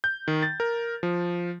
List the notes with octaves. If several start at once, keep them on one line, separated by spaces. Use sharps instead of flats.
G6
D#3
A6
A#4
F3